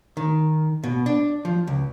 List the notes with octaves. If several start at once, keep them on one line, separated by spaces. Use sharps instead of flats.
D#3
B2
D4
F3
C#2